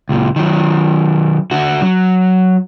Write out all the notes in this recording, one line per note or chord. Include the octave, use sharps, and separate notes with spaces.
C#2 A#2
D#3 F#3
D3 F#4
F#3